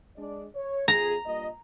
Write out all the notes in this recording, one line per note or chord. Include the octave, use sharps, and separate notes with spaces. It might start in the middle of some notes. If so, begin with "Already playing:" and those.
G#3 D4 D5
C#5
F2 G#4 A#5
G2 A#2 D#5